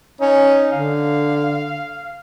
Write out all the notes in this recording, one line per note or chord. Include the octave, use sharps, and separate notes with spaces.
C#4 D#4
D3 F5